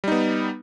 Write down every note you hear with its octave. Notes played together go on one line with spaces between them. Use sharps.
G3 B3 D#4